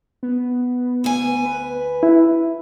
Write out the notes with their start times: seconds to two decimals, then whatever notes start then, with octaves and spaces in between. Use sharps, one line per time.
0.23 B3
1.04 D2 G#5
1.46 B4
2.03 E4